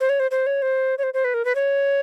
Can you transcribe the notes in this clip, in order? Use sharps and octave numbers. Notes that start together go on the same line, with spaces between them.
C5
C#5
C5
C5
C#5
C5
C#5
C5
C5
B4
A#4
B4
C#5